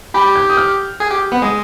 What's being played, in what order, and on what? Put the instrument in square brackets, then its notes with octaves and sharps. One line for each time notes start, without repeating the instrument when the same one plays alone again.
[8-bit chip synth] G4 [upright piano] B5
[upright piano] G6
D#6
F6
[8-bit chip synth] G#4
G4
B3
[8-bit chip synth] G#3 [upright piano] D#6